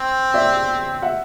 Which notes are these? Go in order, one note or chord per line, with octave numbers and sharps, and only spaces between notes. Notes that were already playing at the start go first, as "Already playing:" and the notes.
Already playing: C4
D5 E5
E5 F#5